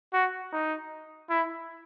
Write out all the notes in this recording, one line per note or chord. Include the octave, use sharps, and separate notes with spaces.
F#4
D#4
E4